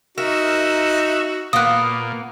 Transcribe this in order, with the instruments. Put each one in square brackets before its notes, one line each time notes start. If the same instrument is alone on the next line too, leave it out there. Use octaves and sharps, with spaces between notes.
[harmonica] D#4 F#4 [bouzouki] A#4 [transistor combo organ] E5
[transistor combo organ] A#2 [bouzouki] A#3 B3 [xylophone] D#6 F#6